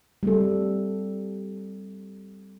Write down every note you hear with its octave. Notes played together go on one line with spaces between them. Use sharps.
G3 A3 C4 A4